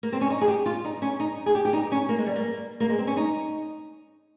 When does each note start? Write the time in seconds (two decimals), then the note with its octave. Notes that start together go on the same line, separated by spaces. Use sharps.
0.03 A#3
0.13 C4
0.21 C#4
0.30 D#4
0.41 G#4
0.48 G4
0.66 F4
0.84 D#4
1.02 C#4
1.20 D#4
1.46 G#4
1.55 G4
1.65 G4
1.73 D#4
1.92 C#4
2.09 A#3
2.19 G#3
2.26 G3
2.36 A#3
2.80 A#3
2.89 G#3
2.99 C4
3.07 C#4
3.17 D#4